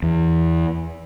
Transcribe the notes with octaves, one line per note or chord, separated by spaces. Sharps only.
E2